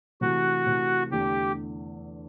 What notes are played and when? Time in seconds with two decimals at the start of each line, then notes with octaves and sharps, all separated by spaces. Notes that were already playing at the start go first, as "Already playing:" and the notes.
0.21 C3 E3 A3 F#4
0.67 C3 E3 A3
1.11 E2 D3 A3 G4